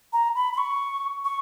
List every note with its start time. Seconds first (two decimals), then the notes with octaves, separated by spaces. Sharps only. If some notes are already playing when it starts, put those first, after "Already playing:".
0.13 A#5
0.35 B5
0.53 B5
0.58 C#6
1.24 C#6